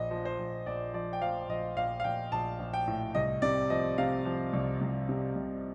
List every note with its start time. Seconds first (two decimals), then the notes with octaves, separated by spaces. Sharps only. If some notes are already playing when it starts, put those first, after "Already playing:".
Already playing: A#1 D#5
0.11 F3
0.25 C5
0.39 A#1
0.66 A#1 D5
0.94 F3 D5
1.13 G5
1.21 F3 F5
1.49 A#1 D#5
1.76 A#1 F5
2.00 F5
2.04 A#1 G5
2.32 A#1 A5
2.59 A#1
2.74 G5
2.87 A2
3.15 C2 D#5
3.42 C3 D5
3.70 F3 D#5
3.98 C3 F5
4.25 F3
4.53 C2
4.81 C2
5.09 C3
5.36 C2